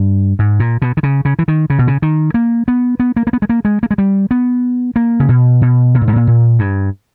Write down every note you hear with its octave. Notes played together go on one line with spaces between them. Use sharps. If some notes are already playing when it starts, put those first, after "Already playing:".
Already playing: G2
G#2
A#2
B2
D#3
C#3
C#3
E3
D#3
C#3
B2
C#3
D#3
A#3
B3
B3
A#3
A#3
B3
G#3
A#3
G#3
A#3
G#3
G3
B3
A#3
C#3
B2
B2
B2
A#2
G#2
A#2
A#2
G2